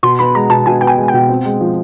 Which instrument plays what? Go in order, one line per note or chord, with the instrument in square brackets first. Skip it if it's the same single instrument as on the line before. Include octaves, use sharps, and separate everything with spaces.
[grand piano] B2 [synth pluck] C6
[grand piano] B3 [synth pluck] B5
[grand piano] G#3 [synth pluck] A#5
[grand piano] B2 [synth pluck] A5
[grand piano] B2 [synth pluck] G#5
[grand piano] B3 [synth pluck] G5
[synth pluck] G#5
[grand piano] G#3
[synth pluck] G5
[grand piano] B2
C4
G#3
F3